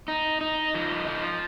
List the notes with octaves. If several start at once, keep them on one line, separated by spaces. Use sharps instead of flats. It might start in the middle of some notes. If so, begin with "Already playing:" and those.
D#4
D#4
F3
F3